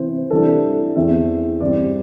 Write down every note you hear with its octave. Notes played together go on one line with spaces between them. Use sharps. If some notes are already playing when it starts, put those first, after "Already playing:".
Already playing: C3 E3 C4 C5
C3 E3 G3 D4 A4
E2 E3 C4 E5
G2 E3 G3 C4 D5